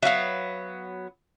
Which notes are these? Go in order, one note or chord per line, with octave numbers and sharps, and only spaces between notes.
F#3 B3 E5 F5